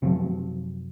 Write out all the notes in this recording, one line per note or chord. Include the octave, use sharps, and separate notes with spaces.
F#2 C3 F3 F#3